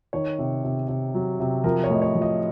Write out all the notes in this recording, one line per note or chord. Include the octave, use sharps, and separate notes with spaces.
D#3 C#5
C3
C3
C3
F#3
C3
F3 A#4
C#5
A2 D#5
C#5
F3
D#5